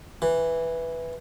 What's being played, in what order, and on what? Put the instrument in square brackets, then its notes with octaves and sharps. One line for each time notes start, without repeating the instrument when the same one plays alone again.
[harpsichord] E3